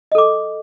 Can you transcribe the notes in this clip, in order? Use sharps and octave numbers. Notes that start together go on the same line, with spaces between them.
A4 D#5 D6